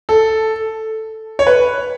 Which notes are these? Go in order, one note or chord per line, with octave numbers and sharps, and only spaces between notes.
A4
C#5
B4